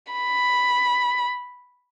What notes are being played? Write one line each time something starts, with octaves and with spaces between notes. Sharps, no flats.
B5